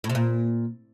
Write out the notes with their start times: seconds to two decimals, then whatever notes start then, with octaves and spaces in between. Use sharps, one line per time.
0.04 A2
0.09 C3
0.15 A#2